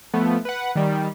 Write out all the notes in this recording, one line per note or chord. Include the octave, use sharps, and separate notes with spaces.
F3 A3 B3
B4 F#5
D#3 G3